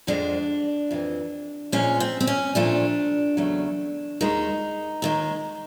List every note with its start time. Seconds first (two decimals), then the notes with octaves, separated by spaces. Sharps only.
0.07 F2 D3 F3 G#3 D4
0.91 F2 C3 E3
1.72 A#2 F3 G#3 C#4
2.00 C4
2.20 C4
2.27 C#4
2.55 A#2 F3 A3 D4
3.37 E2 C#3 F#3 A3
4.21 D#2 D#3 G#3 D#4
5.02 D#2 D#3 G#3